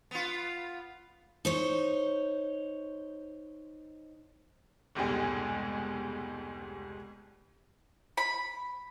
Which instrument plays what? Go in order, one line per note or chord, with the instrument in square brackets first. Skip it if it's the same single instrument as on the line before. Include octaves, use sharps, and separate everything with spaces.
[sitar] B3 F4
[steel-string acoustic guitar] D#4 C5 C#5
[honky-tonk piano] F1 C#2 G#2 B2 G3 G#4
[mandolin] B5